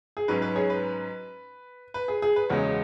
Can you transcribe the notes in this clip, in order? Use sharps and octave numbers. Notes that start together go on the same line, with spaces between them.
G#4
G#2 F#3 C#4 B4
B4
G#4 C#5
B4
B4
G#4
G#4
B4
E1 E2 C#3 G#3 C#5 F#5